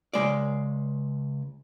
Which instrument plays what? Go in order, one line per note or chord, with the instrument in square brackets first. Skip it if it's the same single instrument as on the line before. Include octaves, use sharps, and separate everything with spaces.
[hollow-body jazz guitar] C#2 C3 G#3 D5